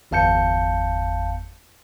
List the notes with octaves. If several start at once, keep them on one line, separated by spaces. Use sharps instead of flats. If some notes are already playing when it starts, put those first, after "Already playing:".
G1 E2 F5 A5 G6 C#7